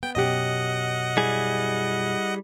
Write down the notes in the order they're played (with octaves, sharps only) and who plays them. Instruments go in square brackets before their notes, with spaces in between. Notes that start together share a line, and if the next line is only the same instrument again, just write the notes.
[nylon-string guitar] B3 [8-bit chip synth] G5
[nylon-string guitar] F#2 B2 G4 [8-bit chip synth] D#5 F#5
[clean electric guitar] G3 E4 G#4